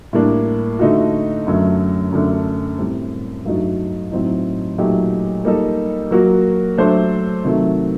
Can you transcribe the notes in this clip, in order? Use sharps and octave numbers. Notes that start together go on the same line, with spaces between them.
A2 G3 A#3 D4
D3 A3 D#4 F#4
F#2 D3 F#3 A3
F#2 D3 A3 D4
A2 G3 C4
G2 F#3 A3 D#4 F#4
A2 F#3 C4 D#4
A#2 F#3 A3 D#4 G4
G3 A#3 D#4 A4
F#3 A#3 F#4
F#3 A3 D4 A4 C5
C3 D#3 F#3 A3